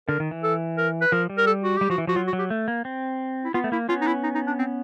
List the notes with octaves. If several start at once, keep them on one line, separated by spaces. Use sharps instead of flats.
D3 A#4
D#3
E3
A4
A#4
B4
F3 A#4
G3
A#4
A4
F#4
G3 G4
F3 F#4
E3
F3 F#4
F#3 F4
F#4
F#3
G4
A3
A#3
C4
E4
B3 F4
A3
A#3 E4
B3 C#4 F4
D#4
E4
D#4
D#4
D4
C4